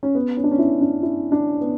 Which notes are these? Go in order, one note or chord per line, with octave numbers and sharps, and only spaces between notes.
C#4
B3
C#4
D4
C#4
E4
D4
E4
D4
B3